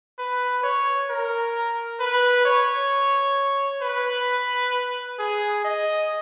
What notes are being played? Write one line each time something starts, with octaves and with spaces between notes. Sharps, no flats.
B4
C#5
A#4
B4
C#5
B4
G#4
D#5